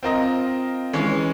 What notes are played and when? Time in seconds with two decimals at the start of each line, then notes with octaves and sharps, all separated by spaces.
0.03 C4 F4 A#4 D#5
0.93 E3 G#3 C#4